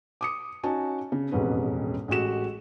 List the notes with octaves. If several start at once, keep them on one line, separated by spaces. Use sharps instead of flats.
D6 D#6 C#7
C#4 D#4 F#4 G#5 A5
C#3
E1 A1 F2 G#2 C#4 B4
A1 G#3 A3 F#4 E7